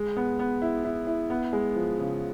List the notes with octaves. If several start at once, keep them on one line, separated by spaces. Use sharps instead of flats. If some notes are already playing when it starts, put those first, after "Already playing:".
Already playing: G#3
B3
B3
E4
E4
E4
B3
G#3
F3
C#3